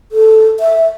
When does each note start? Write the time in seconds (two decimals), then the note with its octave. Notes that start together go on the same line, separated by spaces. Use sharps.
0.12 A4
0.60 E5